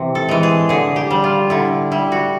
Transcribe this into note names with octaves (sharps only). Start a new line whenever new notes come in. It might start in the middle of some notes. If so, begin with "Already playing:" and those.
Already playing: C3 E3
A4
E3 G#3
G#4
D3 G#4
G4
G3
F4
D3 E4
G3 E4
F#4